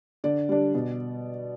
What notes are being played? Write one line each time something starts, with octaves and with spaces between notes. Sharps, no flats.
D3 D5
G3 D4
B2